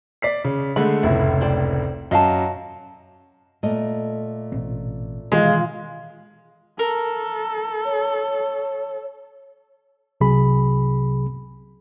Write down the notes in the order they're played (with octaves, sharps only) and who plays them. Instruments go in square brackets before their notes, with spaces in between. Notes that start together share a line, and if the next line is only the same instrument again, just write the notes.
[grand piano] D5 B6 C7
C#3
[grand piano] D3 G#3 A3 [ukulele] B5
[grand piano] F1 C#2 A2 [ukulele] E4
[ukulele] C5 D5 G5
[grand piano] F#2 [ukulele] D#5 F5 A5
[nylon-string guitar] A#2 A3 D#5
[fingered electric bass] A1 B2 C4
[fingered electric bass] B2 D#3 E3 [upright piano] G#3 [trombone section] F4
[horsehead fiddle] A4 [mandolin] A#4
[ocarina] C#5
[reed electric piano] C2 C3 F#3 G#4 B5